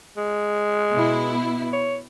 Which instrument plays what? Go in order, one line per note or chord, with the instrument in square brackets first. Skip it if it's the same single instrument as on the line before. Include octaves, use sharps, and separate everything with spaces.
[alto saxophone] G#3
[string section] B2 B3 E4
[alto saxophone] C#5